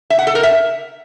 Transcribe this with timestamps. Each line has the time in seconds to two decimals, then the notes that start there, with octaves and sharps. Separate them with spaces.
0.10 E5
0.19 F#5
0.27 A4
0.35 A#4
0.43 E5